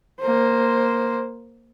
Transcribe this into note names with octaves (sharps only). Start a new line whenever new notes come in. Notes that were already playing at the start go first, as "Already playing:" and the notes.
A#3 C5